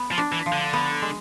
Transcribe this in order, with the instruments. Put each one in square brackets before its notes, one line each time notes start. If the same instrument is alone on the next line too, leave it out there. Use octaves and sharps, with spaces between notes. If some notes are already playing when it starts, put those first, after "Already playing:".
Already playing: [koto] B3
[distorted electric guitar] F3
[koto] D4
[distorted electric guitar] E3
[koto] F3
[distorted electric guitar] D3
[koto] B3
G#3